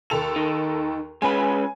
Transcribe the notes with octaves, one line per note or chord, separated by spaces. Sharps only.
D#2 A4 F7
D#3
G#3 C#4 B4 G#5